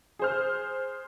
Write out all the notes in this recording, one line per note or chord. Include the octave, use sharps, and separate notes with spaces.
G#4 C5 F6